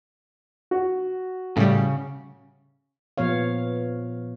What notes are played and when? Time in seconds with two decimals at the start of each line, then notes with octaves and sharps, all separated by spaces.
0.71 F#4
1.57 A2 C#3 G3
3.18 A#2 F3 B3 C#5 F5